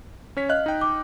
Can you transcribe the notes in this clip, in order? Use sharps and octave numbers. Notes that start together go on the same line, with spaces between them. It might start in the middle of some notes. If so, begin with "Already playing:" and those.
C#4 C#5 B6
D#5 F5 F6 F#6
D#4 G5
D6